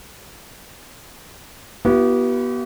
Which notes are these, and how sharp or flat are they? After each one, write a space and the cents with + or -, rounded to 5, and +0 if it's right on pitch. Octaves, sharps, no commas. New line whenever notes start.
B3 -25 E4 +35 G4 -45